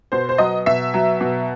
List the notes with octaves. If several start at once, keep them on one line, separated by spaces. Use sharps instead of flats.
B2 C5
C5
F#3 D#5
B2 E5
F#3
B2